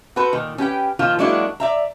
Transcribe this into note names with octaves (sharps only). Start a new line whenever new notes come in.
F#4 A4 B4 C5
A#2 D#3
C#4 G4 B4 G5
A#2 D#3 F3 F4
F#3 G#3 A#3 D4 E4 F#4
D5 E5 A#5